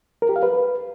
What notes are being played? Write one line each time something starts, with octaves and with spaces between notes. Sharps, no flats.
A#4
G4
F5
B4